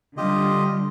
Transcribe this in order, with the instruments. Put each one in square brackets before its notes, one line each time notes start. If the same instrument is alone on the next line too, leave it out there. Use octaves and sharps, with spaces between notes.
[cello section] D3 G3 [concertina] F4 G4 D#5